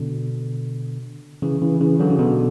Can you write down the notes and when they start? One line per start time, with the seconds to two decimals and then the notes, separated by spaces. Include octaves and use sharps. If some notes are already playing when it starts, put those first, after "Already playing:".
Already playing: B2 D3
1.42 C#3 E3
1.62 C#3 E3
1.81 C#3 E3
1.99 D3 F#3
2.10 C#3
2.18 B2 D3